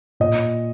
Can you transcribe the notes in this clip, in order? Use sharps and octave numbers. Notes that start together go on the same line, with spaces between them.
A#2 D#5